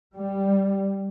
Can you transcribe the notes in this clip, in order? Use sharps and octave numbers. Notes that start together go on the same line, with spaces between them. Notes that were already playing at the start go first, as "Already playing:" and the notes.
G3